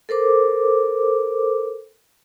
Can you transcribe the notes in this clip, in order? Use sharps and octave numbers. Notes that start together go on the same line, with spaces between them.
A4 A#4 C5 D6